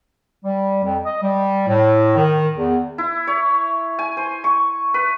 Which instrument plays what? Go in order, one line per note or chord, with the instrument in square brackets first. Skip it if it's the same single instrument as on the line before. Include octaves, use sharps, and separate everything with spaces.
[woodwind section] G3
F2
D#5
G3
A2
D#3
E2
[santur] E4
C#5
G#5
C5
C#6
B4